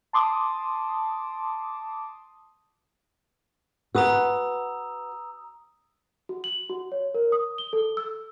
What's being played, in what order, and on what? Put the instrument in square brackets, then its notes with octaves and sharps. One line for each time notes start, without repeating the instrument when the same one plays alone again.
[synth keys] A5 C6 D6 D#6
[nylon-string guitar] F#4 B4 [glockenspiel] A#5 D#6 E6
[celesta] F#4
F#7
F#4
C#5
A#4
D#6
G7
A4
E6